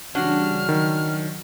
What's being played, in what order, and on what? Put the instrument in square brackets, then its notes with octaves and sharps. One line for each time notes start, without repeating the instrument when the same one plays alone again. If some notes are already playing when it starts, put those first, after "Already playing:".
[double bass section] C#3 E3 G3 [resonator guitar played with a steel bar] C#4 D4 F#4 [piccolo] F6
[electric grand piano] D#3 [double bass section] F#3